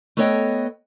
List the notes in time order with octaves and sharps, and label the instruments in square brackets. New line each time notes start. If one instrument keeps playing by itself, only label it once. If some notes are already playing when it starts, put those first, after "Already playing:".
[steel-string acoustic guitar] A3 B3 A4 C#5 D#5 G5